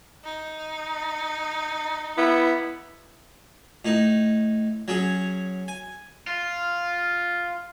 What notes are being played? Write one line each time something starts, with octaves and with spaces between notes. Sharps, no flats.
D#4
B3 E4
A2 D#4
F#3 C#4 G#4
G#5
F4